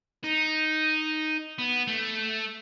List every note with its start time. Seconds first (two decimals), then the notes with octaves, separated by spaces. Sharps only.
0.24 D#4
1.58 B3
1.87 A3